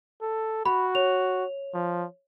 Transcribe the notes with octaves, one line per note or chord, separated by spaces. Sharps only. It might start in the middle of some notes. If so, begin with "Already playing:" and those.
A4
F#4 B5
C#5 F7
F3